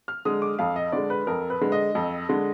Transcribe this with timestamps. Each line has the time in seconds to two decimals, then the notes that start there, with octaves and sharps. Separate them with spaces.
0.08 F6
0.25 D3 G#3 D#6
0.42 D6
0.59 F2 F5
0.76 D#5
0.92 D3 G#3 D5
1.10 B4
1.27 F2 A#4
1.50 B4
1.61 D3 G#3
1.72 D#5
1.95 F2
2.29 D3 G#3